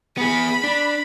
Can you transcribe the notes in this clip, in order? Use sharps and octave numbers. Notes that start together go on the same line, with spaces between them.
B3 G#4 B5
D4